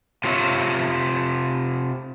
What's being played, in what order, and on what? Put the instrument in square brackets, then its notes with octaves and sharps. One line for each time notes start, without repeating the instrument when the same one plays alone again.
[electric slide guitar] C3 F4 C#5 E5